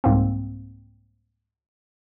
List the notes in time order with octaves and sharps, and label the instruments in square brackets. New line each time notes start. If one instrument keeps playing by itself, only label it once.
[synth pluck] C2 G#2 A#3 C4